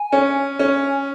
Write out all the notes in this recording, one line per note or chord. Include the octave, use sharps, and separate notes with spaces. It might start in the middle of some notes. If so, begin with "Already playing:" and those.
Already playing: G#5
C#4
C#4